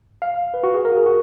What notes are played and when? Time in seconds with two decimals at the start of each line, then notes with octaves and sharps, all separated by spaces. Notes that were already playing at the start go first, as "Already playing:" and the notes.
0.22 F5
0.54 B4
0.63 F#4
0.74 G#4
0.85 A#4
0.92 F#4
0.96 G#4
1.06 F#4